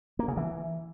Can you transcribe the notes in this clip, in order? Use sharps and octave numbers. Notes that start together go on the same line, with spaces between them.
A#3
C#3
E3